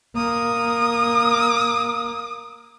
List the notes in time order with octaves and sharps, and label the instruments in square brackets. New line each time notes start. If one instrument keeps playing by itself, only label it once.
[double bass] A#3 [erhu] D#6